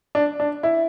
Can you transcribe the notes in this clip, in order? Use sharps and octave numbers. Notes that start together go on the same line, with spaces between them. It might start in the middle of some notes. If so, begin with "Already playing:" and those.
D4
D4
E4